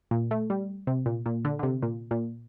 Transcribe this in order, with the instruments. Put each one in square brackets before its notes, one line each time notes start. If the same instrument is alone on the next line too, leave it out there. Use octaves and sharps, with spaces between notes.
[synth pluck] A#2
A3
G3
C3
A#2
A#2
D3
D3
C3
A#2
A#2